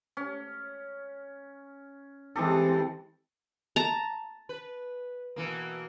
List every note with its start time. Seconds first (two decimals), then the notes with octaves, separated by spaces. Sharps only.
0.17 C#4
2.36 E3 G#3 C4 G4 A4
3.76 A5 A#5
4.49 B4
5.36 B2 E3 A#3